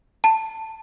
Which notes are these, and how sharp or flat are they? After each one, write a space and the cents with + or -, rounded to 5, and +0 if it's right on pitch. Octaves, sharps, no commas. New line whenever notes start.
A5 +15